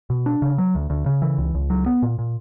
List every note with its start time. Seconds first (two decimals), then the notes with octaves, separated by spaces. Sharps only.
0.10 B2
0.26 D4
0.42 C#3
0.58 F#3
0.75 D2
0.90 D2
1.06 C#3
1.22 E3
1.38 C#2
1.55 C#2
1.70 F#3
1.86 B3
2.02 A#2
2.19 A#2